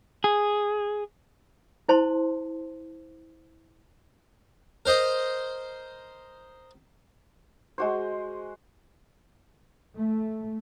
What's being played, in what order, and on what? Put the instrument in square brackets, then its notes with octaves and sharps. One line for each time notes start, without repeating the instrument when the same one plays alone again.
[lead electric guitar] G#4
[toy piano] E4 C5 A5 C6
[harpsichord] A#4 C5 D#5
[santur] G#3 F#4 C5
[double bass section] A3